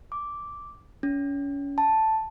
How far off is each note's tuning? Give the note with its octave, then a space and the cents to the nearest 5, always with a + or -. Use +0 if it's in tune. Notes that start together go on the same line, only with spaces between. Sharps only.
D6 -5
C#4 +25
A5 +0